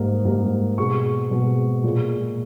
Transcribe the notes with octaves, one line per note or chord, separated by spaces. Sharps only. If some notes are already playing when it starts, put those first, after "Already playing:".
Already playing: G#2 G3 A#3
G#2 G3 A#3
B2 G#3 C#6
B2 G#3
A#2 G#3